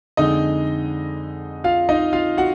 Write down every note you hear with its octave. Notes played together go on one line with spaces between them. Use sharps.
F2 D3 G#3 D#4 D#5
F4 F5
D#4 D#5
F4 F5
F#4 F#5